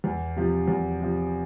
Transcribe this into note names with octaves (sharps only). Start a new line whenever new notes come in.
E2
C3 F3
E2
C3 F3